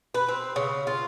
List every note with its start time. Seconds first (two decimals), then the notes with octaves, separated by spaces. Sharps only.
0.14 B4
0.28 C4
0.56 C#3
0.87 F4